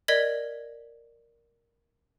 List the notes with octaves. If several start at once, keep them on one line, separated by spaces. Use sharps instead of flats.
A#4 D5 D#5 G#6 B6 F#7